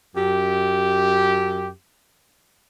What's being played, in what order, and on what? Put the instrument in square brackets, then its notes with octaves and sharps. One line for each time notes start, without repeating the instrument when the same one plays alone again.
[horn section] F#2 G4